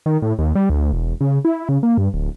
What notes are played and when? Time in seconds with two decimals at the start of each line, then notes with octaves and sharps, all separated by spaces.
0.06 D#3
0.22 A2
0.39 D#2
0.55 G3
0.70 D2
0.93 E1
1.21 C#3
1.45 E4
1.69 C#3
1.83 A#3
1.98 G2
2.14 D1